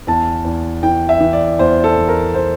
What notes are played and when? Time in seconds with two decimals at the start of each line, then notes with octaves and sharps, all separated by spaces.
0.07 E2 A5
0.45 E2
0.83 E3 G5
1.09 E5
1.20 E3
1.33 D5
1.59 E2 C5
1.84 A4
1.96 E2
2.09 A#4
2.34 C5